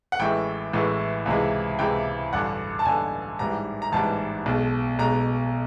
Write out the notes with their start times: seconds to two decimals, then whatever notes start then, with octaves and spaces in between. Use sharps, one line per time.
0.12 F#5
0.19 A1 A2 E3 G#3 G5
0.73 A1 A2 E3 G#3
1.26 C#2 C3 E3 G#3
1.79 C#2 C3 E3 G#3 G5
2.33 A1 G2 D3 F#5
2.79 A5
2.85 A1 G2 D3 G#5
3.39 A1 G#2 E3 G3 A#5
3.82 A#5
3.92 A1 G#2 E3 G3 A5
4.46 B1 B2 G#3
4.99 B1 B2 G#3 A#5